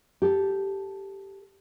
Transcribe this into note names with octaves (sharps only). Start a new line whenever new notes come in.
G4 A4